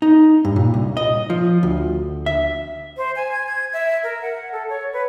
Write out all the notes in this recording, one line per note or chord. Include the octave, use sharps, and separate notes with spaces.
D#4
G2
A#2
C2
D#5
F3
D2
E5
C5
G#5
G#6
G#6
E5
A#4
F#5
A4
C#5
B4